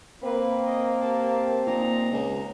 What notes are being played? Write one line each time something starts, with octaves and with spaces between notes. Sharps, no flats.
A#3 C4 B4
D#5
G4 A5
A#2 D#4 A#5
C#2